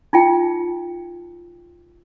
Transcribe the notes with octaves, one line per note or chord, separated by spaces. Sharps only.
D#4 F4 G5